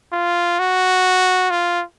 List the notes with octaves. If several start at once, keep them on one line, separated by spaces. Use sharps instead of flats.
F4
F#4
F4